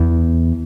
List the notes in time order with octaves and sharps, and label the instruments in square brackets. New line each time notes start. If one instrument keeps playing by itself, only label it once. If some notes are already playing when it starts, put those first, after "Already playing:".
Already playing: [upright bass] E2